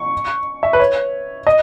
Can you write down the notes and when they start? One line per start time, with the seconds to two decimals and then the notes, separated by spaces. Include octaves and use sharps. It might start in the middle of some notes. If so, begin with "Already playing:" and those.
Already playing: C#6
0.63 E5
0.73 B4
0.80 C#5
1.47 D#5